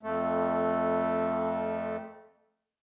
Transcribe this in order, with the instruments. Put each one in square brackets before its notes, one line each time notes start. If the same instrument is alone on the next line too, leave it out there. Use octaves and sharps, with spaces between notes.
[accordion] F2 A3